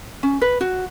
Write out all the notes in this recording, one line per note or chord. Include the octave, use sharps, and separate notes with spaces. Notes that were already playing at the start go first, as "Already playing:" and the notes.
C#4
B4
F#4